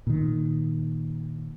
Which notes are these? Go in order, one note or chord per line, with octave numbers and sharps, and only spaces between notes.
A#2 D#3